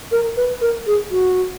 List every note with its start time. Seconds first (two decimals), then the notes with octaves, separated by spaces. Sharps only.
0.12 A#4
0.37 B4
0.61 A#4
0.87 G#4
1.11 F#4